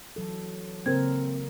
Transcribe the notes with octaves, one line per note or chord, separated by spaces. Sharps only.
E3 F#3 A4
C#3 A#3 C4 A#4 G#6